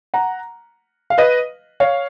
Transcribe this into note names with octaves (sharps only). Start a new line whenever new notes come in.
F#5 A#5
F5
B4 D#5
C#5 F5